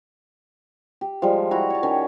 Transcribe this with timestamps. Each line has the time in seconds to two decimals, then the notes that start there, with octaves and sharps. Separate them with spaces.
1.01 G4
1.22 F3 G3 G#3
1.51 E4 F#4 A#5
1.70 C#5 A5
1.83 D#3 C#4